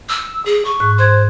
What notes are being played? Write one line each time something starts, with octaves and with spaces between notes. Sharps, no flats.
E6
G#4
C#6
G#2 F#6
C5 C6 F#6 G#6